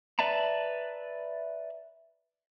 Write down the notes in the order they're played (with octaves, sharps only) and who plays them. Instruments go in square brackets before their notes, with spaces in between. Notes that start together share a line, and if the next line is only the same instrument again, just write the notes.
[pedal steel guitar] B4 D5 E5 A5 A#5